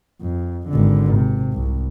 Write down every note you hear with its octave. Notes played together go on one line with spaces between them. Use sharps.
F2
G#1 D3
C3
C2